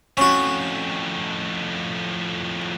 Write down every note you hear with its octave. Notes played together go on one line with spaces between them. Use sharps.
F2 A2 C#4 F#4